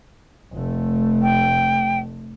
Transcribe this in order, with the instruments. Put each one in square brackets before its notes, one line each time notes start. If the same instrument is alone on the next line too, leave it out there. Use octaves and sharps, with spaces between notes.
[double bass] F1 A3
[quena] G5